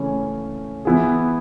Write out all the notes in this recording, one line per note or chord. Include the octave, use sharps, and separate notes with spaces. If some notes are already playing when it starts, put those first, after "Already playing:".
Already playing: C#3 E3 A3 C#4 E4
E3 B3 E4 G#4